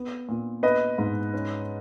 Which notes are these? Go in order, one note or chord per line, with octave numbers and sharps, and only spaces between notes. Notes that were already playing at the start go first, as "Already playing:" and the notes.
Already playing: B3
A#2
B3 B4 D#5
G#2
C#4